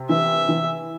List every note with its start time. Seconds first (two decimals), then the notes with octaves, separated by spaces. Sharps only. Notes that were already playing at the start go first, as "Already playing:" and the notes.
Already playing: C3
0.09 E3 E5
0.49 E3